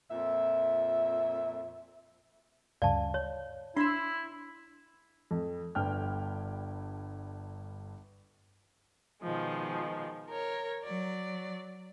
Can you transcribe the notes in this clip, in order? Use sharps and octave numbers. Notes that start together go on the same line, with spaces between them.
F2 A#2 E5
D2 G2 C#3 D5 F5 A5
C#5
D4 E4 C6 E6
F2
G1 G2 G5 F6
B2 D#3 F3 G#3
A#4 C#5
F#3 D5